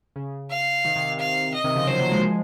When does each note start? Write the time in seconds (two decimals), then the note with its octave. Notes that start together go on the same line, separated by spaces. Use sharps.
0.16 C#3
0.50 F5
0.84 C3 D#3
0.96 C3 D#3
1.07 C3
1.19 C3 F5
1.53 D#5
1.64 C3 D#3
1.76 C#3 F3
1.87 D#3 F#3 C5
1.99 F#3 A#3
2.11 F3 G#3